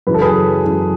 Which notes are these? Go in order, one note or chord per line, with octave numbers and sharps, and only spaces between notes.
F#2 C#3 E3 B4
A4
G#4 B4
F#2 C#3 E3